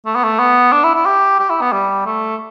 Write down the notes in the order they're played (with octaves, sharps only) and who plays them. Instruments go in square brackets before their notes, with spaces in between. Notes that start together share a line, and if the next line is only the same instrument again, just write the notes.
[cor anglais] A3
B3
A3
B3
D4
E4
E4
G4
G4
E4
B3
G3
A3